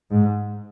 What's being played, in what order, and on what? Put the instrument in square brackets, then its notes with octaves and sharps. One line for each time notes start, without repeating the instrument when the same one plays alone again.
[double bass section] G#2